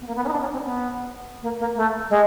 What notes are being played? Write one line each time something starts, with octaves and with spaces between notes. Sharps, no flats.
B3
A#3
B3
C#4
D#4
D4
C#4
C4
B3
A#3
A#3
A3
G#3